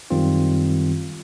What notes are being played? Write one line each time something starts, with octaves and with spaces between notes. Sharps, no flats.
F#2 D#3 G3 C4 F4